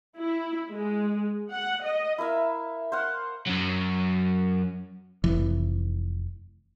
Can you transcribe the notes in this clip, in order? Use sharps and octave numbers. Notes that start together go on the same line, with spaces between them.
E4
G#3
F#5
D#5
E4 A#4 E5 F5
C5 F5 F#5
F#2 F#3
F1 E3